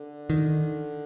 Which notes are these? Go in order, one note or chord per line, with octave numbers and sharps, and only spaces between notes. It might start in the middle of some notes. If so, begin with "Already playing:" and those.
Already playing: D3
D#3